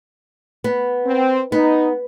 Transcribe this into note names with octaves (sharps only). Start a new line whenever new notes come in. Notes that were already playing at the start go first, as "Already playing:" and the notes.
B3
C4
B3 D#4